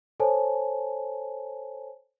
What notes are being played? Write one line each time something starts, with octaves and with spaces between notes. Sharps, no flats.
A4 C5 C#5 G#5 A5